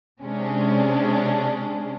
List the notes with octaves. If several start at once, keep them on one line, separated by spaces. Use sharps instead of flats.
C3 G#3 C#4 D4